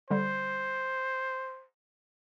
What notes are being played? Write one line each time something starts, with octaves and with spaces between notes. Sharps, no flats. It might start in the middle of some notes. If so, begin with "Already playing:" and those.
D3 G3 C5